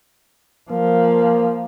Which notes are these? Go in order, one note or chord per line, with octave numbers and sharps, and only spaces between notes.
F3 A#3